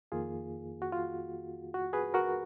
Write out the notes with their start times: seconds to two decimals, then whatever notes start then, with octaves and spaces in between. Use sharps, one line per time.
0.12 F2 D#3 A#3 F4 G#4
0.82 F#4
0.92 F4
1.74 F#4
1.93 G#4 B4
2.14 F#4 A#4